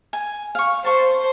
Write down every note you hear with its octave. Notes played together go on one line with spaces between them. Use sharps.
G#5
F5 C#6
C5 A5 C#6